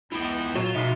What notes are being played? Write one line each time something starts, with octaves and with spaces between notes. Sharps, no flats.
C#2 B3 E4 F4 G5
A#2 F#3 F4 C#5 E7
G#2 B2 F#4 G#4 E5